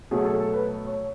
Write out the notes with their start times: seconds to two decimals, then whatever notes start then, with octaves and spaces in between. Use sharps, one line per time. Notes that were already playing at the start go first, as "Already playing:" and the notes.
0.11 B2 F#3 A3 G#4
0.25 A4
0.40 A4
0.53 B4
0.87 C#5